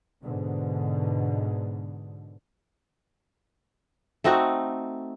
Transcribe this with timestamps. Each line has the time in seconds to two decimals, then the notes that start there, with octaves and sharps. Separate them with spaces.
0.23 G#2 B2 D3
4.24 A3 C4 D#4 F#4